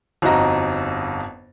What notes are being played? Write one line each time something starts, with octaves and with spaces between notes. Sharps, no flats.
G1 F2 D#4 F#4 D#5 A#5